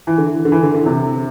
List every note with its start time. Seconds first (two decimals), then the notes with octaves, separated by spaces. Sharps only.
0.07 E3
0.18 D3
0.45 D3
0.52 E3
0.63 D3
0.74 D3
0.86 C3